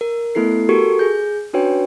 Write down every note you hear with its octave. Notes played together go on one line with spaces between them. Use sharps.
A#4
A3 B3 E4 A4 C7
F#4 G4 A4 A#4 C#6
G#4 G6
C#4 D4 F#4 B4 C#5 G5